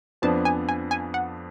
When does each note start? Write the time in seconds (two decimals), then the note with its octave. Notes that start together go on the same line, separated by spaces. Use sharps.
0.22 F2 F3 B3 D4 A5
0.45 G#5
0.69 G#5
0.91 G#5
1.14 F#5